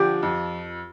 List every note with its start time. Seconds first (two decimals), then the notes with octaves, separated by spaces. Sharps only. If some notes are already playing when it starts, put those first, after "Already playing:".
Already playing: D3 F3 G4
0.23 F2